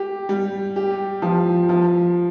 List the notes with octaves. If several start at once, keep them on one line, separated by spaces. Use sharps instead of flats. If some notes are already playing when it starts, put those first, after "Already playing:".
Already playing: G4
G3
G4
F3
F3